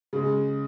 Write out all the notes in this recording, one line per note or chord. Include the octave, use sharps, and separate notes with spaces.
C#3 G#3